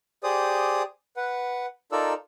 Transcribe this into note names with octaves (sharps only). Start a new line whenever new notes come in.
G4 G#4 C5 D5 D#6
B4 F#5
D#4 F4 A4 A#4 D5 E6